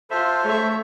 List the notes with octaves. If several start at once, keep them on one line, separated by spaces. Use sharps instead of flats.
F4 A4 C5 E5
A3 C#5 E5